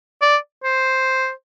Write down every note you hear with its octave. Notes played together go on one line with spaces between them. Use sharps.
D5
C5